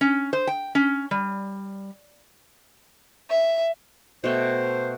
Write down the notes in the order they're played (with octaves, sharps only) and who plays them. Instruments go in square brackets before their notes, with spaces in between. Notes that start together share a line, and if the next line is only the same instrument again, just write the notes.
[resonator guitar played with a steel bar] C#4
C5
G5
C#4
G3
[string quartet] E5
[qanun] B2 A3 G5 [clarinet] C5